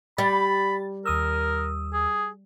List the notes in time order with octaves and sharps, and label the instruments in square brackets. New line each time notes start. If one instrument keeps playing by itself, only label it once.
[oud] G3 [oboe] B5 [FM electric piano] A6
[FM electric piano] D#2 D#6 E6 [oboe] A#4
[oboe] G#4